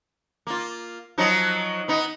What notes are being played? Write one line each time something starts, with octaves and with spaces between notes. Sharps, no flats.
A#3 F4
F3 F#3 D#4
B3 D#4